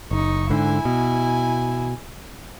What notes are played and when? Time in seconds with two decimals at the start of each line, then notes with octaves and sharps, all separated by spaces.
0.11 F#1 D#4 C#6
0.50 G#2 D3 E4 G#5
0.85 B2